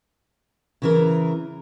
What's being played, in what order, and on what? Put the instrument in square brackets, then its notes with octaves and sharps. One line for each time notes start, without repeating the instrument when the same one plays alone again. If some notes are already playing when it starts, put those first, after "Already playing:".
[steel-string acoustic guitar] C#3 E3 A#4